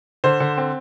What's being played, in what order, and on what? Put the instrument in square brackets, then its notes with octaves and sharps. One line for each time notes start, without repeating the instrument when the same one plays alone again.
[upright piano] D3 C5
D3
C4